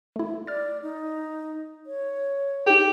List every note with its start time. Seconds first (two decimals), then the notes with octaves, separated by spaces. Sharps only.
0.16 A3 E4
0.47 D5 F6 A6
0.83 D#4
1.86 C#5
2.66 D#4 G4 G#4